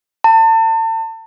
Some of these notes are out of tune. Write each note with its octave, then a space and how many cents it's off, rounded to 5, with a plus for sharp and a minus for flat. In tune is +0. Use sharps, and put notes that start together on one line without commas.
A5 +35